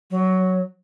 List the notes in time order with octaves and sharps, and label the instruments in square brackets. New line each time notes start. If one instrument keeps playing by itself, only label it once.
[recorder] F#3